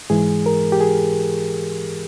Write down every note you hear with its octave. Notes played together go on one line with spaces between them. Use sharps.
G#2 E3 G#3 G#4
A#4
G4
G#4